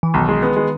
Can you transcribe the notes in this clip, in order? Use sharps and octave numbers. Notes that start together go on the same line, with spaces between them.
E3
B1 D#3
G#3
B3
G#3